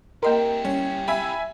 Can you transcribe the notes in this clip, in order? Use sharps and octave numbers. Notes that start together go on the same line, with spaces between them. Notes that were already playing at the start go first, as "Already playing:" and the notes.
A#3 E4 G4 A#4 D#5 C6
G3 C#4
E5 G#5 B5